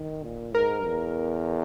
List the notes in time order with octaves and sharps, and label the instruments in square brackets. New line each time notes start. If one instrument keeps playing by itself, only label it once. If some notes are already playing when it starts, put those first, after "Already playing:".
Already playing: [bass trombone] D#3
A#2
[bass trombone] G#2 [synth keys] A#4
[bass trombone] E2